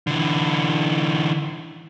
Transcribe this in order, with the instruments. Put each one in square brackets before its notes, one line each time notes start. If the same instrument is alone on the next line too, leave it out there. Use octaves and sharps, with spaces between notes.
[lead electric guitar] D3 E3